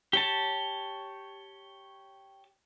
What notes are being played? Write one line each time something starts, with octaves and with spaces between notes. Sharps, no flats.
G4 C#5 A5